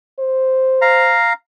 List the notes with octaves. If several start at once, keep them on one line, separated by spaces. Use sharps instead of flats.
C5
F5 A#5